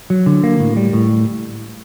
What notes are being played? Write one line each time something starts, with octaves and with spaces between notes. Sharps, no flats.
F#3
D3
A#3
A2
G3
A2